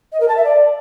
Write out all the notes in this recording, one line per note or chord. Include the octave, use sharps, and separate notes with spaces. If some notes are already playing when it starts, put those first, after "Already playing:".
D#5
A#4
A5
E5
D5